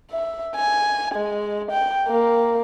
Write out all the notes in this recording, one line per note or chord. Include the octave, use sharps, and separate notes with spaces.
E5
G#5
G#3
G5
A#3